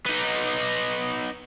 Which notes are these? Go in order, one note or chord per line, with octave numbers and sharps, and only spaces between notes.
B3 D#4